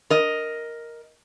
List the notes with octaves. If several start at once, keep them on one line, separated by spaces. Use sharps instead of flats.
A#4 D#5